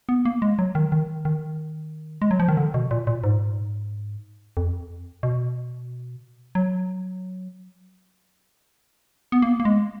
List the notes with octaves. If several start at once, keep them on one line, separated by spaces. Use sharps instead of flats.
B3
A#3
G#3
F#3
D#3
D#3
D#3
G#3
F#3
F3
D#3
D3
B2
A#2
A#2
G#2
F2
B2
F#3
B3
A#3
A#3
G#3